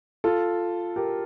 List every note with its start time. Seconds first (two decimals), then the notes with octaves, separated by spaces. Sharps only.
0.24 F4 A4
0.96 G4 A#4